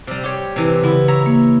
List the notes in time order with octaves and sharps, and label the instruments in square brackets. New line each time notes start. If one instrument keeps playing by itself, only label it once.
[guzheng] C3 G3
G4 C#5
C3 E3
[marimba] C#3 [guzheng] B3 E4
[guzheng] C#5 E5 A#5
[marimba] A#3